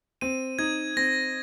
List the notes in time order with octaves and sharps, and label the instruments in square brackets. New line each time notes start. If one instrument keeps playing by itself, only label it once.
[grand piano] C4 [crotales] D#7
[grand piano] D#4 [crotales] G#6
[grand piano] C4 [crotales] A#6